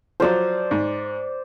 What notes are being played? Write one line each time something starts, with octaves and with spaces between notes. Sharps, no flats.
F3 F#3 C5 D5
G#2